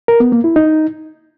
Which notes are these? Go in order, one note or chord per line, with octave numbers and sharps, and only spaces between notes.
A#4
B3
A#3
E4
D#4